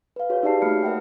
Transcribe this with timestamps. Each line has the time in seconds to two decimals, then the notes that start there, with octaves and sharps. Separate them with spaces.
0.16 B4 F5
0.30 F#4 G#4 C#5
0.43 D#4 G4 D5 E5 A5 C7
0.62 A3 A#3 B5 F6 C#7
0.83 A#4 E5 F#5 G5